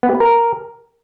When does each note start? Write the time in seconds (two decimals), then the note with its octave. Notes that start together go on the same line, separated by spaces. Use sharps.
0.03 B3
0.09 G4
0.15 B4
0.20 A#4